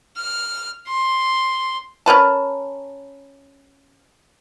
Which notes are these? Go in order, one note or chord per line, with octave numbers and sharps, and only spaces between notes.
F6
C6
C#4 A#4 B4 A5